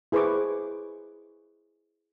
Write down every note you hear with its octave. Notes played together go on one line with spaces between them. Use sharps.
E4 G#4 B4 C5 C#6 D6